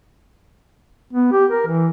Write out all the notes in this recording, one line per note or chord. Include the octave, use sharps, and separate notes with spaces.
B3
G4
A#4
E3